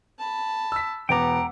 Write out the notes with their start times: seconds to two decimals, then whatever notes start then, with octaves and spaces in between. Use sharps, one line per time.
0.19 A5 B5
0.72 E6 B6
1.09 E1 B3 F#5 G5 A#5 D6